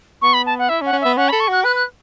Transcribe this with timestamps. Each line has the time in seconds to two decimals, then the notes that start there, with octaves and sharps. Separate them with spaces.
0.22 B3 C#6
0.33 B5
0.46 A5
0.58 F#5
0.69 E4 E5
0.81 C#4
0.86 F#5
0.93 C#4
1.01 B3 E5
1.17 C#4 F#5
1.29 B5
1.32 A4
1.40 C#6
1.48 F#4 F#6
1.64 B4 F#6
1.76 F#6